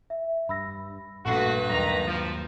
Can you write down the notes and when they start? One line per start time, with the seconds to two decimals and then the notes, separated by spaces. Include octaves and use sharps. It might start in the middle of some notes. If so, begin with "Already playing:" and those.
0.10 E5
0.49 G2 B5 E6 A#6
1.26 A#1 G2 A#2 A3 F#4 B4 C#6 C7
1.70 D#2 A2 D#3 F#3 G#3 A#5
2.07 F3